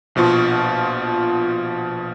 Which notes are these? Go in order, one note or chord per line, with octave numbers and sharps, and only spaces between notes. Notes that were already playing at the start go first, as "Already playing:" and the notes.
A#1 B2 F3 F4 C#6